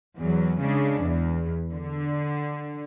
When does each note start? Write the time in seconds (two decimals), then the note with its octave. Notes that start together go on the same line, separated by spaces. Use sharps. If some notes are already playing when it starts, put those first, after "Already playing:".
0.18 E2 F#3
0.61 C#3 G#3 D4
1.01 E2
1.73 D3